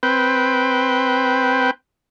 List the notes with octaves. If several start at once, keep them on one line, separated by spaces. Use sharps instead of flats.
C4 B4 G5